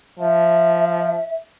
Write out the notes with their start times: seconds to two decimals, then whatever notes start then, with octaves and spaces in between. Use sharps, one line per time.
0.19 F3 E5